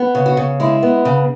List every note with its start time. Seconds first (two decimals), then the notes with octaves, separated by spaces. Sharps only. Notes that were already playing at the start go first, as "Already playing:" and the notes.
Already playing: B3
0.15 C#3
0.26 F#4
0.37 C#3
0.60 G#3 E4
0.83 B3
1.05 C#3